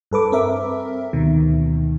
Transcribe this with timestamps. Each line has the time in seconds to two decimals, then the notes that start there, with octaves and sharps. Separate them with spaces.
0.11 G2 A4 B4 D6
0.32 C4 A#4 E5
1.13 D2 B2 D#3